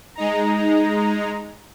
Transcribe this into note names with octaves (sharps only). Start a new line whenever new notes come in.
G#3 D#4 A#5